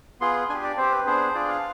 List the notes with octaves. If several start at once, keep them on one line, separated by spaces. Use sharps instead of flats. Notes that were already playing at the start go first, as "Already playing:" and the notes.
B3 F4 G#4 C6
D4 G4 G#5
D5
C4 G4 C5
B4
B3 D4 G#4 C5
D4 F4 G#4 D5
F5